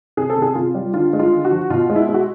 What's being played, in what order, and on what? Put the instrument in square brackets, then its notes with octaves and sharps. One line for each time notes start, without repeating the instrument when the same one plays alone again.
[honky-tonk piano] C3 G#4
A4
C3
G#4
C3 F4
G3
D3 F4
G#3
F4
D3
F#4
F3
B2 F4
G#3
E4
G#3
F#4